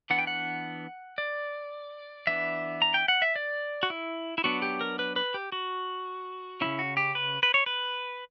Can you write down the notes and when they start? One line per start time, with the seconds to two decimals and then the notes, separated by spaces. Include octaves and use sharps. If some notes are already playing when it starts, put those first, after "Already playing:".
0.10 E3 B3 D4 F#5
0.19 G5
0.27 F#5
1.18 D5
2.27 E3 B3 D4 E5
2.82 A#5
2.94 G5
3.08 F#5
3.22 E5
3.36 D5
3.83 F#4
3.90 E4
4.38 E4
4.44 F#3 B3 D4 F#4
4.62 G4
4.81 A#4
4.99 B4
5.16 B4
5.34 G4
5.52 F#4
6.61 C#3 G3 C#4 E4
6.79 F#4
6.97 G4
7.15 B4
7.43 B4
7.54 C#5
7.66 B4